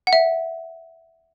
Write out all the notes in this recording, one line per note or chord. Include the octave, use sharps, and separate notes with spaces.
F#5
E5